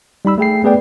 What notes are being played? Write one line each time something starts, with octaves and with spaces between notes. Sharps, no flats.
G3 D#4 B5 E6
A3 G#4 G5 C7
A3 B3 G#4 B4 D5 G5